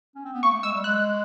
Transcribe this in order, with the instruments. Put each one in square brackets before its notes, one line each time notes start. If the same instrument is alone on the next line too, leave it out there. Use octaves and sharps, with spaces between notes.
[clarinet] C#4
C4
B3
[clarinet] A#3 [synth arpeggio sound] C#6
[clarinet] A3
[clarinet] G#3 [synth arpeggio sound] E6
[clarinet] G3
[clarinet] G#3 [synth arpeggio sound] F#6